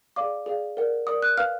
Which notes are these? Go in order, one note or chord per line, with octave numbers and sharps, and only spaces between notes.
G#4 D5 F5 D6
G#4 D5 F5
A#4 D5 F#5
A#4 D5 F#5 D#6
F#6
B4 F5 F6